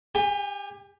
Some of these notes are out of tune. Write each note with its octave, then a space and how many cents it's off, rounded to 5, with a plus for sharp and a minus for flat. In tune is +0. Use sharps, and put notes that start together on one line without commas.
G4 +20 G#5 -25